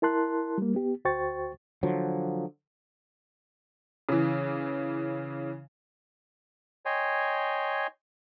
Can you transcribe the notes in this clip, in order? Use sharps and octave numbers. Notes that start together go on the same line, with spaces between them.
E4 A#4 A5 C6 F#6
G3 A#3
B3 G4
D2 F#4 C5 G5 C#6 A6
D3 F3 F#3
C#3 E3
C#5 D#5 G5 G#5 C6